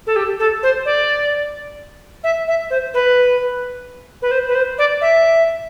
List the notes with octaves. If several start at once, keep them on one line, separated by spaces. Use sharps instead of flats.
A4
G4
A4
C5
D5
E5
E5
C5
B4
B4
C5
B4
C5
D5
E5